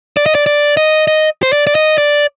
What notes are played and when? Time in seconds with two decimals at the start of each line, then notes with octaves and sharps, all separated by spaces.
0.17 D5
0.26 D#5
0.35 D5
0.46 D5
0.77 D#5
1.08 D#5
1.43 C5
1.53 D5
1.67 D5
1.75 D#5
1.98 D5